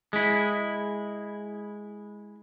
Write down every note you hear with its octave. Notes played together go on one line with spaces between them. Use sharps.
G#3 E4